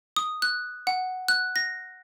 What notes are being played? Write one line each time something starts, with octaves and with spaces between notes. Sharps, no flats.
D#6
F#6
F#5
F#6
A#6